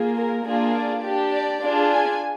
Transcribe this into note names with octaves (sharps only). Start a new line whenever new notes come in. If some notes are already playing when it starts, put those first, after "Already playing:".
Already playing: A#3 F4 G#4
A#4
A#3 D4 F4 G#4
D5
D4 G4
D5
D4 F4 G#4
G#5